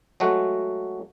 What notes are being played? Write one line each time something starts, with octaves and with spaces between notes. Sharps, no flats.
F#3 G#3 A3 F#4